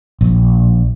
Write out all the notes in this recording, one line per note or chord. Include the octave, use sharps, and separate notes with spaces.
A#1